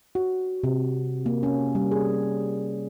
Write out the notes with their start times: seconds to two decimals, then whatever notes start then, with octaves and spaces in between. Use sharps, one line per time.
0.15 F#4
0.63 C3
1.26 A#3
1.43 C#4
1.75 G3
1.91 G#4